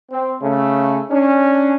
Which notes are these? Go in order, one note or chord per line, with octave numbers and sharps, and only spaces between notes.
C4
C#3 A3
C#4 D4